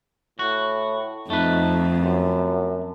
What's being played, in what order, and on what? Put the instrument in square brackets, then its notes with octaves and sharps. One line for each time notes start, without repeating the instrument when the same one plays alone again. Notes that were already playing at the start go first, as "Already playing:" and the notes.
[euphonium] A2 [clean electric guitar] F#4
[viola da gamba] F2 [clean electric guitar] A3 B4 [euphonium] D#4
[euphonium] F#2